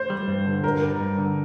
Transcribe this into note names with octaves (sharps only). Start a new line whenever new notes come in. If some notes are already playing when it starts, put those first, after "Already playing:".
Already playing: C5
G3
G2
D3
G2 A#4
G3
G2
D3